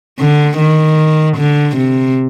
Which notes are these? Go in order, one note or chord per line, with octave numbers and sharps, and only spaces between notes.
D3
D#3
D3
C3